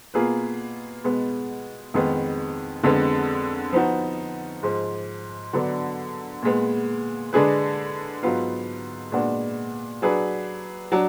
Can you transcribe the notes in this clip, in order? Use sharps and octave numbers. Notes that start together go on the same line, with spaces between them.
B2 A#3 F4 G#4 B4
B2 G#3 B3
F2 D#3 G#3 B3
F2 D3 G#3 B3
F3 B3 D#4 F#4
G#2 F3 G#3
D3 F#3 B3 D4
A#2 G#3 B3
D3 G#3 D4 G#4 B4
G#2 F#3 B3 F4
A#2 G#3 B3 D4 F#4
F#3 D4 G#4 B4
F#3 D4